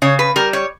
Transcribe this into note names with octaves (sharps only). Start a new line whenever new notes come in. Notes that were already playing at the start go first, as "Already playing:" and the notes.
C#3 C#5
B4
G3 A#4
C#5